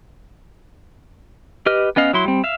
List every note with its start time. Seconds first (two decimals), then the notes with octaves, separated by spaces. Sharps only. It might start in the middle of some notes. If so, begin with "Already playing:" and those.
1.66 G4 B4 D#5 F6
1.96 B3 C#4 D#5 F5
2.13 F#3 E4 C6
2.25 G3 C4
2.44 E5 F5